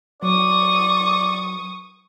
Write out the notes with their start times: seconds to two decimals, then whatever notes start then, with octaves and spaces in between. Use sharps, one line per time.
0.23 F#3 D5 C#6 D#6